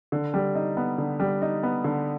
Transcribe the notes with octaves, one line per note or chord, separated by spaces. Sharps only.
D3
G3
D#4
B3
D3
G3
D#4
B3
D3